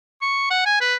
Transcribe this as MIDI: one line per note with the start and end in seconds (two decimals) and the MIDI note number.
0.22 0.47 85
0.50 0.63 78
0.66 0.80 80
0.81 0.95 71